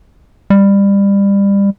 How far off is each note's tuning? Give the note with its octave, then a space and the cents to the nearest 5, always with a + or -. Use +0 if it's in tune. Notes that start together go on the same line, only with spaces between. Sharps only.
G3 +25